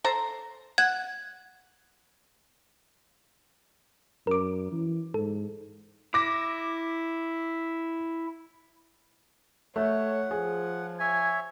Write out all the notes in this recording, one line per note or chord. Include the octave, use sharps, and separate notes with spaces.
A4 C5 A#5
F#5 G#6
F#2 A#4 D6
E3
G#2 A4
E4 D6 A#6
A3 C#5 F#5
F3 G#4
C#5 E5 G#5